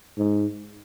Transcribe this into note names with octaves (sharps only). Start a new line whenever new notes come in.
G#2